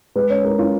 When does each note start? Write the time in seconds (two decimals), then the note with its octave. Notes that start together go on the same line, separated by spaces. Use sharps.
0.16 G#3 B4
0.30 C#4 C#5
0.44 G#3 A#4
0.58 C#4 F4